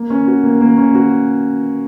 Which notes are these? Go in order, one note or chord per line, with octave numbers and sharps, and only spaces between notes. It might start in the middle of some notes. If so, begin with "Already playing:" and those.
Already playing: A#3
C#4
F#4
A#3
A#3
C#4
F#4